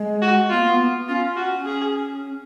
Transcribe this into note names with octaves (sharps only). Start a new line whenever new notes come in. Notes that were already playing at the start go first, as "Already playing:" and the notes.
Already playing: G#3
F#4
B3 F4
A#3
B3
C#4 F4
F#4
G#4